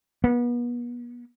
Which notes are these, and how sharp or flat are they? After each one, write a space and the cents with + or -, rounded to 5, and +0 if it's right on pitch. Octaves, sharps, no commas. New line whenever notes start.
B3 -35